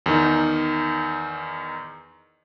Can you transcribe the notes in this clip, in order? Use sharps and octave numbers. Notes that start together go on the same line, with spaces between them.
E2 D#3 D#4